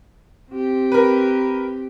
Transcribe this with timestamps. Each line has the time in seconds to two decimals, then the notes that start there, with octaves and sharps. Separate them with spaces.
0.51 C4 G4
0.92 A#4 B4